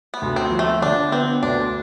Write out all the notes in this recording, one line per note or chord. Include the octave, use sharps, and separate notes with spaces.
B3
D2
C4
F3
A3
D3 D4
B3 C4
D2 D4